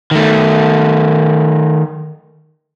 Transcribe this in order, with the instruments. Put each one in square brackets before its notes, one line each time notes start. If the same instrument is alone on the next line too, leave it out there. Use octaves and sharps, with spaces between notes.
[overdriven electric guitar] D#3 A3